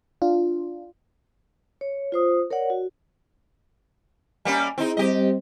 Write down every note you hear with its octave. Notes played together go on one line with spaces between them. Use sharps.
D4 F4
C#5
F4 C5 D#6
A#4 C#5 D5 F#5
F#4
G3 A#3 C#4 G#5
C4 D#4 E4 G#4
G3 C4 G4 C5 D#5